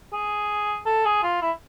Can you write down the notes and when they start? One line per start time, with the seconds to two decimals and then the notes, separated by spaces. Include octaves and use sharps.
0.13 G#4
0.86 A4
1.05 G#4
1.23 F4
1.42 E4